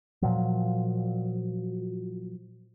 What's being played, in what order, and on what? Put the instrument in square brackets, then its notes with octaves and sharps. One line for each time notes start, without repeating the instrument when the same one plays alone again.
[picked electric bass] A#2 F3 F#3